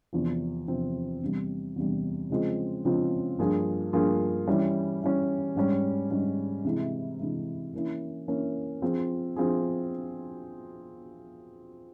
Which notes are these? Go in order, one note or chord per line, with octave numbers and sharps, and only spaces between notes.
E2 C3 F3 C4
E2 C3 F3 C4
E2 C3 G3
E2 C3 G3
C#3 F3 G#3 C4 F4
C#3 F3 G#3 C4 F4
G2 F3 A#3 F4 G#4
G2 F3 A#3 F4 G#4
E3 G3 C#4
E3 G3 C#4
G#2 G3 C#4
G#2 G3 C#4
C3 E3 G#3 E4
C3 E3 G#3 E4
E3 A#3 C#4 E4
E3 A#3 C#4 E4
F3 C4 F4 G#4
F3 C4 F4 G#4